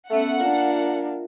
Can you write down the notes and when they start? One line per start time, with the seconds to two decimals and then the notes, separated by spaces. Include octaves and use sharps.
0.10 A3 B3 C#4 A4 E5 F#5
0.39 A#3 D4 F4 A#4 E5